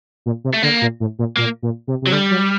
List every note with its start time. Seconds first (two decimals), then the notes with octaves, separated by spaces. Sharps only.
0.26 A#2
0.44 C3
0.54 A3
0.63 D3 A#3
0.82 A#2
1.00 A2
1.19 A#2
1.37 A#2 A#3
1.63 A#2
1.88 C3
2.02 C3 F#3
2.12 D3 G3
2.31 F#3